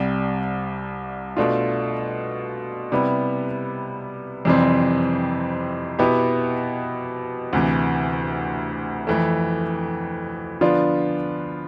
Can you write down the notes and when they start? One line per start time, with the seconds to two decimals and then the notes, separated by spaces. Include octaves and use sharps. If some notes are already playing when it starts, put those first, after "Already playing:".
Already playing: C2 C3 G3
1.37 B2 A3 D4 F4
2.92 C3 G3 B3 E4
4.45 F2 C3 E3 G3 C4
5.99 B2 B3 E4 G4
7.53 D2 C3 E3
9.07 F2 E3 A3
10.61 D3 F3 B3 D4 F4